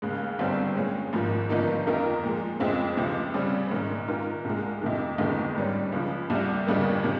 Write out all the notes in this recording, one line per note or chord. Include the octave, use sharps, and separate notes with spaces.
D#2 C#3 G#3
G1 G2 G3 C4
A#2 G#3 C#4
G#1 G#2 F3 A#3
G1 G2 F3 A#3 D#4
F2 D#3 A#3 F4 A#4
A#2 F3 G#3
F2 C#3 G#3 C4
C#2 C3 F3
C#3 G3 C4
A#1 G#2 D#3
G#2 D#3 A#3 F4 A#4
C2 A#2 G#3
F2 C3 D#3
G1 F2 D#3 G#3
G#2 G3 C#4
C#2 C#3 F3
C2 C3 G3
G1 F2 C#3 G3 A#3
C3 D#3